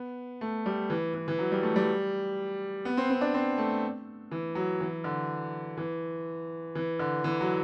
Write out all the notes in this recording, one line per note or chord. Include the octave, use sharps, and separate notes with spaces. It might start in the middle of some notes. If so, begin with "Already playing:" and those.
Already playing: B3
A3
G3
E3
E3
E3
F#3
G3
A3
G3
B3
C4
C4
D4
C4
A3
E3
F#3
E3
D3
E3
E3
D3
E3
F#3